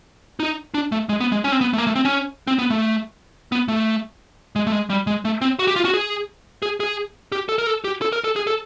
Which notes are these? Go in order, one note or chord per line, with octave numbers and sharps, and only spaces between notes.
D#4
D4
A3
G#3
B3
G#3
C#4
C4
B3
A3
A#3
A3
C4
C#4
C4
B3
A3
B3
A3
G#3
A3
G#3
G3
G#3
A3
C4
F#4
G4
F4
F#4
G#4
G#4
G#4
G4
A4
A#4
A4
G4
A4
A#4
A4
G#4
A4